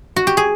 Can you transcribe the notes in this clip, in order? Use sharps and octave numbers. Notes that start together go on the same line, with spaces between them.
F#4
G4
G#4